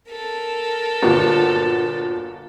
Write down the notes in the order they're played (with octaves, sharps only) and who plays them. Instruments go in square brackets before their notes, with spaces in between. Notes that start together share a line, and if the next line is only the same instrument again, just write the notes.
[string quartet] A4 A#4
[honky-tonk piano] G1 A#2 F#4